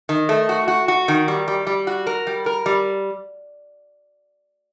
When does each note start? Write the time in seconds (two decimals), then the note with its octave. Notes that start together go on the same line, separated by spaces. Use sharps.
0.09 D#3
0.29 A3
0.49 F#4
0.68 F#4
0.88 F#4
1.08 D#3
1.28 G3
1.48 G3
1.67 G3
1.87 F#4
2.07 A#4
2.27 G3
2.46 A#4
2.66 G3